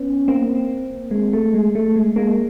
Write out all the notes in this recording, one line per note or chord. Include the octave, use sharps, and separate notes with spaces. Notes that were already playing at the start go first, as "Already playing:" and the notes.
Already playing: B3 C#4
A#3 C4
G#3
A3
G#3
A3
G#3
G#3 A#3